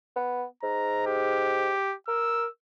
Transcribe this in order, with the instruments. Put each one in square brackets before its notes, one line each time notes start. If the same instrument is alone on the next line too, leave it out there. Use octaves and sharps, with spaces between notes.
[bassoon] B3
[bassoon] G#2 [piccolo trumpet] A#5
[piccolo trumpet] G4
[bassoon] A#4 [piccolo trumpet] E6